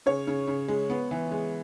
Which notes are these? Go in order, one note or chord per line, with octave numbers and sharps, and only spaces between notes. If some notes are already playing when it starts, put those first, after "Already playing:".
C#3 C#5
C#3
C#3
G#3
B3
E3
G#3